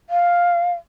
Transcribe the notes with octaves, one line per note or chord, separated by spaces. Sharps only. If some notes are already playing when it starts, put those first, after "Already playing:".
F5